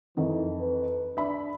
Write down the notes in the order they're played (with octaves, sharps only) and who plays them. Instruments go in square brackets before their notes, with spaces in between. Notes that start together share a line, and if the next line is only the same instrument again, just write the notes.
[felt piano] F2 D#3 [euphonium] E3
[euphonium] B4
[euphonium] D4 [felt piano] E5 B5